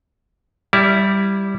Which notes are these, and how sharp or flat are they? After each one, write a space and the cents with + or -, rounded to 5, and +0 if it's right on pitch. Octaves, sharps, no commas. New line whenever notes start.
G3 +0 E4 +0 D5 -45